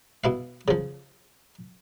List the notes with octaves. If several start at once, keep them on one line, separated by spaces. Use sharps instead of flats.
B2 E4 F5
C#3 F3